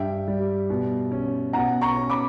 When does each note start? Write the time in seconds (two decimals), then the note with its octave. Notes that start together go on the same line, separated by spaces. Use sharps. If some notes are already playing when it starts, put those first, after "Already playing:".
Already playing: G2 E5 G5
0.28 G3
0.70 B2
1.12 C#4
1.53 B2 F#5 A#5
1.81 A#5 C#6
1.96 C#4
2.10 B5 D6